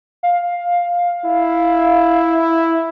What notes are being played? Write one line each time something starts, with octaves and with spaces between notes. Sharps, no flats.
F5
E4